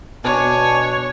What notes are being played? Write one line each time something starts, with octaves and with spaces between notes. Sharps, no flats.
B2 D4 C#5 G#5